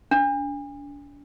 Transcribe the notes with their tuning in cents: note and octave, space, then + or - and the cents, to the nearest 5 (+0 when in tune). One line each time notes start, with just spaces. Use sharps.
D4 -40